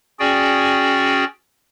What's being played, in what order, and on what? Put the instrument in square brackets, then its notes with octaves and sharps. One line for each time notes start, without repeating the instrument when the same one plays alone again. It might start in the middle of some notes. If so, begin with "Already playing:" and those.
[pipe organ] C#4 F#4 G#4 D5 G5